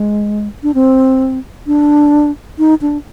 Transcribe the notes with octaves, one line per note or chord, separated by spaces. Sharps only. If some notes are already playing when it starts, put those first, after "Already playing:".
Already playing: G#3
D4
C4
D4
D#4
D4